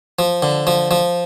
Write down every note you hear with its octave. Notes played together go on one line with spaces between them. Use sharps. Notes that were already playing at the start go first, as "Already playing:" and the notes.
F3
D3
F3
F3